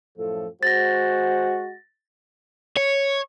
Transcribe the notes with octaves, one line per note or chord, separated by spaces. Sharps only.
F#2 A2 F3 A4
G#3 F#4 C5 A6 A#6
C#5